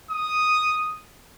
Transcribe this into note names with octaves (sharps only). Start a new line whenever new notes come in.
D#6